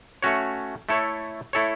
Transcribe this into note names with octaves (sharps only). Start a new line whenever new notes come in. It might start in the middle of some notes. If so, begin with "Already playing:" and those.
A3 C#4 F#4 C#5
A3 E4 A4 C#5
A3 E4 A4 C#5